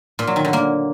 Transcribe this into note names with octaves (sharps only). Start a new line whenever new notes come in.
A#2
F#3
D#3
D3
A#3